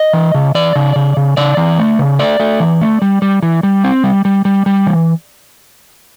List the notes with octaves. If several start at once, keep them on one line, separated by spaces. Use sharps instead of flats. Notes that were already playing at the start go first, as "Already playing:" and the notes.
Already playing: D#5
E3
C#3
E3 D5
C#3
C#3
C#3
C#3 D5
E3
A3
C#3
A3 D5
A3
E3
A3
G3
G3
E3
G3
C4
G3
G3
G3
G3
E3